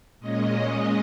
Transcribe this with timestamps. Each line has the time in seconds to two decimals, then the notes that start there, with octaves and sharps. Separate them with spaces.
0.20 A#2 G#3 C#4 D#5